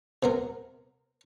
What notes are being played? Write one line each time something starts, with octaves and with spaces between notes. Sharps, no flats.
C3 B3 A#4